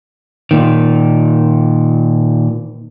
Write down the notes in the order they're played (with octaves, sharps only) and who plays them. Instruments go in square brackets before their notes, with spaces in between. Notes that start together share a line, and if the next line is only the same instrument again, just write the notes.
[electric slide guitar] A#2 D#3